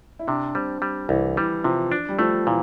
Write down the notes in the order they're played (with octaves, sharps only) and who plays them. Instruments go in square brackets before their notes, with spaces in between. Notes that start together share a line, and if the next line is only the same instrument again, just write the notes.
[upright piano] E4
[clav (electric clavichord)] C3 [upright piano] D4
[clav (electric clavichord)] G3 [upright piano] C4
[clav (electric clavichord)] G3
[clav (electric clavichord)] C2 [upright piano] E3
[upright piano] E3 [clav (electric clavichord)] G3
[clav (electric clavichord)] C3 [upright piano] F3
[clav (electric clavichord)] D4
[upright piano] G3
[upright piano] F3 [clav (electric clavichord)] A3
[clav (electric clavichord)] A#2 [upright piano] E3